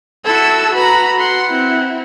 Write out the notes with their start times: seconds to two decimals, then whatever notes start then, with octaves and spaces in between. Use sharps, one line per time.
0.25 E4 F#4 A4 E6
0.74 F#4 B4 A#5 B5
1.19 F#5 C6
1.50 C4 E4